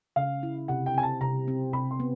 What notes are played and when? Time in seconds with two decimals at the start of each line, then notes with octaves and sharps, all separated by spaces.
0.16 C#3 F5
0.43 E4
0.68 C3 F#5
0.86 G5
0.94 C4 G#5
1.03 A5
1.21 C3 A#5
1.48 C4
1.73 C3 B5
1.91 C6
2.00 B3